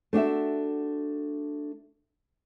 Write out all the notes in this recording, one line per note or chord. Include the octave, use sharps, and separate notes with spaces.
A3 D4 F#4 E5